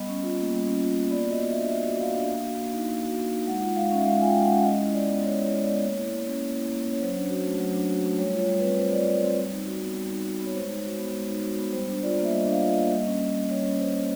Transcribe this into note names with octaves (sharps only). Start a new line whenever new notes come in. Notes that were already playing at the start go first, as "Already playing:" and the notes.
Already playing: G3 B3 D#5
C#4
F4
A#3
G3
C#4
F4
A#3
B3 D5
D5
F#4 D#5
B3
E5
D4
B3 E5
F#4
B3 F5
D4
A#3
F#4
A#3
D#4
A#3
F#4
A#3
D#4
G#3 F#5
F4
G#3 F5
C#4
E5
G#3 F5
F4 G#5
G5
G#3
F#5
C#4
G#3 D#5
E4
G#3 D5
B3
G#3 C#5
E4 C#5
G#3
D5
B3
A#3 C#5
E4
A#3
C#4
A#3
E4
A#3
C#4
C#5
F#3 C5
D4
F#4
A3
F#3
D4
F#4
A3
G3 C#5
F4
C#5
G3
C4 B4
G3 C5
F4 D5
G3 D5
C4
G3
D#4
F#4
B3
G3
D#4
F#4
B3
C#5
G#3 C5
D#4
F#4
B3
G#3
D#4
F#4
B3
G3 C5
D4
F4 D5
A#3
E5
G3 D#5
D4
F5
F4
D#5
A#3
G3
C#4
G3
A#3
G3 C#5
C#4
G3 C5
A#3